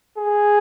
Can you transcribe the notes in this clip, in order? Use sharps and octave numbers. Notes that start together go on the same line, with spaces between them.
G#4